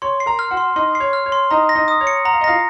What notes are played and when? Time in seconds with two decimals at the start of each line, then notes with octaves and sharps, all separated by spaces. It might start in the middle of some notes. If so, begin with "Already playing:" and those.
0.02 C#5 C6 C#6
0.20 C7
0.26 A#4 A#5
0.39 F6
0.51 F#4 F#5
0.57 C6
0.76 D#4 D#5 C6
0.95 C7
1.00 C#5
1.13 F6
1.26 C#5
1.32 C6
1.51 D#4 D#5 A#5
1.69 A#6
1.75 D#4 D#5
1.88 D#6
2.01 C#5
2.07 C#7
2.25 F#5 A#5
2.33 F5
2.41 D#5
2.44 F4 F5 A#6